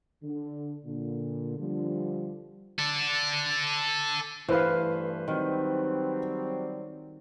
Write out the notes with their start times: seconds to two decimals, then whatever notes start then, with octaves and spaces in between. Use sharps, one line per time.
0.23 D3
0.85 A#2 D3
1.59 D3 F3 G3
2.78 A4 D5
4.48 G2 E3 A3 B4 C5 F5
5.28 D#3 F#3 G3 C4